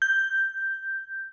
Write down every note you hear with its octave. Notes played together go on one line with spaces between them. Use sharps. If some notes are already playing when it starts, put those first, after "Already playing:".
G6